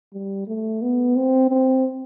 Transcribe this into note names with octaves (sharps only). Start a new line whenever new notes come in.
G3
A3
B3
C4
C4